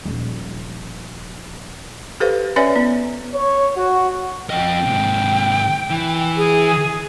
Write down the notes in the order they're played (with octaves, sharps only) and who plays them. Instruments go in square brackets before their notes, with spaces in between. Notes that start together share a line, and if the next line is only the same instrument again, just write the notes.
[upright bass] D#1 F3
[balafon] G4 A4 B4 C5 F5
C#4 B4 C#5 D5 E5 G#5
B3
[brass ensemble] C#5
F#4
[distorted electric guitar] F2 D#5 [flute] G5
[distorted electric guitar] G#2 C3
E3
[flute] G#4